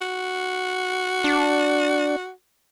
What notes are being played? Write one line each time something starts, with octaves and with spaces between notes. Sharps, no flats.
F#4
D4